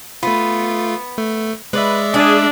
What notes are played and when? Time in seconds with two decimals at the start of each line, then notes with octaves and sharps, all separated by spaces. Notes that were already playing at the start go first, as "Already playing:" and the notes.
0.23 A3 B3 F4
1.18 A3
1.73 G#3 B4 D5 E5
2.14 D4 G#4